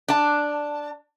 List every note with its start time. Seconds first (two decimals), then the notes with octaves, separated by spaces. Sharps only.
0.08 D4 A5